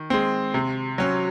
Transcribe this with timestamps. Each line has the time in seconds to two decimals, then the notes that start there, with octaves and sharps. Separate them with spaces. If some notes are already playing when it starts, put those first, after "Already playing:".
Already playing: D#3
0.10 G#3 C4
0.54 C3
0.98 F#3 C#4